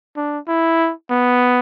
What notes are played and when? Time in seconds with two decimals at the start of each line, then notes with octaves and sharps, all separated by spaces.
0.17 D4
0.48 E4
1.11 B3